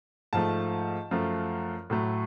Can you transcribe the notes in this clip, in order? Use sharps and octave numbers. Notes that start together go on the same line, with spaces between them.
G#2 F3 A3 A5
F#2 F3 A3
A2 F#3 A3